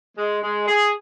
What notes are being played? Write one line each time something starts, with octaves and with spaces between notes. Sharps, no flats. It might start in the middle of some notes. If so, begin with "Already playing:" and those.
G#3
G#3
G#4